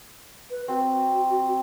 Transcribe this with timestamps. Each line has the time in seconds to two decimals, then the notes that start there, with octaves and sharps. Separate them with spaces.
0.50 B4
0.68 C4 F#4